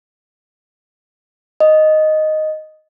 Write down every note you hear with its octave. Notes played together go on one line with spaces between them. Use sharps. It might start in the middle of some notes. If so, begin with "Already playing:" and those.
D#5